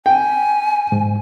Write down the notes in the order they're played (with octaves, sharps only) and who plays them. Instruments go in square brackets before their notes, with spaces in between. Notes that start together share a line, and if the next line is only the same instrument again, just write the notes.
[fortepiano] G5 [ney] G#5
[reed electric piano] G#2